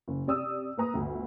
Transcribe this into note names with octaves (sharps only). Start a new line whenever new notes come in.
F#1
C3 D5 D#6 E6
A#3 B4 A#5 D#6
G1 D2